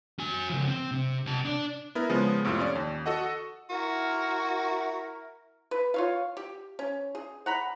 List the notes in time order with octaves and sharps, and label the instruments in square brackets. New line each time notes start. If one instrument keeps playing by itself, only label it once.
[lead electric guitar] F#4 G#5
C#3 F3
C4
C3
C3 A5
D4 D5
[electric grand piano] B3 E4 A#4
C#3 F3 G#3 B3
F2 A2 C3 F4
C#4 D5
D#2
F#4 A4 D#5 F#5
[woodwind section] E4 A#4 [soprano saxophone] F#4
[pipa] B4
F4 C#5 F5
G4
C#4
G#4
F#5 A#5 B5